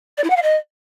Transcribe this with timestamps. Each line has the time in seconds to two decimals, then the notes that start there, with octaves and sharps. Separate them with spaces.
0.17 D5
0.24 E4
0.30 F#5
0.36 F5
0.42 D#5